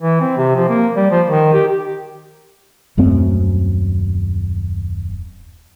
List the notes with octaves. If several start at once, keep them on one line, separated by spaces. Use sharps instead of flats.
E3
C4
C3
F3
A#3
G3
F3
D#3
G4
D#1 F#2 A3 C4